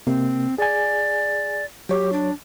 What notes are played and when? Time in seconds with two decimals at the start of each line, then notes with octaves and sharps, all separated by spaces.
0.07 C3 A#3 C4
0.58 G#4 D5 G#5
1.89 F#3 G4 C#5
2.13 D4